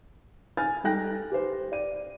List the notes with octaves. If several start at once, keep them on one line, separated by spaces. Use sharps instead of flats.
G#5 F6 A6
G3 D#4 A4 G5 F#6 A#6
G4 B4 C5
D5 D#7